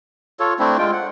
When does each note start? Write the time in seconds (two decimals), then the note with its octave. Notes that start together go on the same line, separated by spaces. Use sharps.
0.39 F4 A4 C#5
0.59 A3 C4 D4 E4
0.78 G#3 F4 G5
0.93 F#5